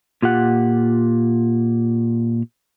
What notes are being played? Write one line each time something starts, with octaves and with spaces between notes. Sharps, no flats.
A#2 F4 G4 F#5